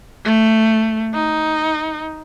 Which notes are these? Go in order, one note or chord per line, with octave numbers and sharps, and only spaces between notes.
A3
D#4